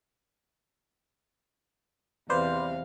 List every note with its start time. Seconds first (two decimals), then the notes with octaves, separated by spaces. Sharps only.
2.30 E2 C3 B4 C5 D5 F5